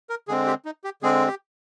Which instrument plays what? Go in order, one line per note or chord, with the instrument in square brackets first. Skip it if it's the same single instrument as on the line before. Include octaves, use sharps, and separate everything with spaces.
[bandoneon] A#4
D3 G#3 C4 G#4
G4
D#4
G4
D3 G#3 C4 G#4
G4